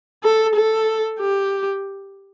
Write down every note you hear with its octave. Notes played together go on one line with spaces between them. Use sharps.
A4
A4
G4